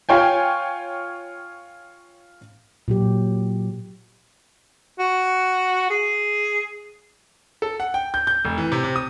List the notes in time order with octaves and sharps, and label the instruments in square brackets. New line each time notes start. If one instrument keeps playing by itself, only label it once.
[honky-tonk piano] F4 C#5 G5 G#5
[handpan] A#2 F#3 G4
[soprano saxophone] F#4
G#4
[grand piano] A4
F#5
G5
G6
G6
F1
E3
C3
C3
D#6